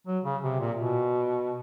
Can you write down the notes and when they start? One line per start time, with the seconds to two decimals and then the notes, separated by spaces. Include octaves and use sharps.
0.07 F#3
0.24 C#3
0.43 C3
0.60 A#2
0.79 B2